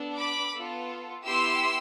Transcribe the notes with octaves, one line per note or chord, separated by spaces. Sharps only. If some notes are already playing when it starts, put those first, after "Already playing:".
Already playing: B3 D4 A4
B5 D6
B3 F4 A4
B3 E4 G4 C6 E6